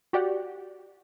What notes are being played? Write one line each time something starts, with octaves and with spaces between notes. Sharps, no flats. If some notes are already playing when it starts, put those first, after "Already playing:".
F#4 G4 D5 F#5